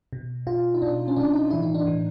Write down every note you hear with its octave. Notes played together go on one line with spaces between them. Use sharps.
B2
B2 F4
D#4
B2 D4
C#4
B2 D4
D#4
A2 E3 E4
D#4
D4
A2 E3